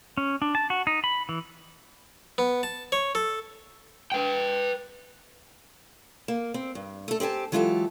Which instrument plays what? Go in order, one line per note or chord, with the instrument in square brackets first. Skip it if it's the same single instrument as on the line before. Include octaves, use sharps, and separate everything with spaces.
[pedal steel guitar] C#4
D4
A5
F#4
D#4
B5
E3
[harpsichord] B3
A5
C#5
A4
[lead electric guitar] B4 G5
[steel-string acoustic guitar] A#3
C4
G2
A3 A4
C4 G4 C5 G#5 A5
E3 F#3 G#3 F4 G4 A4